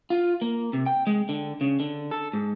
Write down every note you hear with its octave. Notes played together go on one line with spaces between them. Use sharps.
F4
A#3
C3
G5
G#3
D3
C#3
D3
A4
G#2